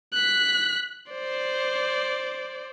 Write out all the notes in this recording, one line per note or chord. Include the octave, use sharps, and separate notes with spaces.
F#6 B6
C5 D5